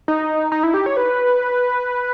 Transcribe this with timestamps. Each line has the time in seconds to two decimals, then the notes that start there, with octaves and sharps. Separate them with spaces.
0.08 D#4
0.52 D#4
0.63 E4
0.74 G4
0.86 C#5
0.97 B4